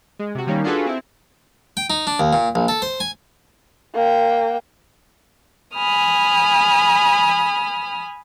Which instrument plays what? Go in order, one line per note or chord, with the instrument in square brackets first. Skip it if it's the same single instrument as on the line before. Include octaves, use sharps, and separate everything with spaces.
[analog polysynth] G#3
C3 F#4
D#3 G3 A#3 C#4 D#4
D4 F4 F#4 G#4 A4 B4
C4 E4
[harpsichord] G5
D#4
D4
D#2
A#2
A#1
A4
C5
G#5
[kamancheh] A#3 G5
[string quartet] G#5 B5 D#6 F6